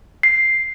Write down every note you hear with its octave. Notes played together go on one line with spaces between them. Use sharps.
C7